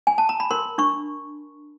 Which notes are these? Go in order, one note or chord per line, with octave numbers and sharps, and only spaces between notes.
G#5
A5
A#5
B5
A#4 C6
D4 C#6